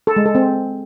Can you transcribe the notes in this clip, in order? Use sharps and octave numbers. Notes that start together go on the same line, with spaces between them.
A4
G#3
A4
C4